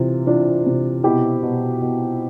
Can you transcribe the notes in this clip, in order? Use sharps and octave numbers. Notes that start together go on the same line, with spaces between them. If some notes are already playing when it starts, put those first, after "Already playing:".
Already playing: C3 E3 F4
E3 D4 F4
C3
B2 E4 G4
B2
B2